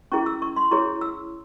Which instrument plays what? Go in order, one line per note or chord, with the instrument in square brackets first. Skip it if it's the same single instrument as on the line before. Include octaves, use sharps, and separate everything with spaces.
[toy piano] C#4 E4 G#4 C#6
E6
C#6
C6
E4 G#4 C#5 C#6
E6